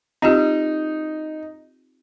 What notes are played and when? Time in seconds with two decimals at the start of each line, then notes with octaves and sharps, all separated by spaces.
0.22 C4 D#4 F4 G4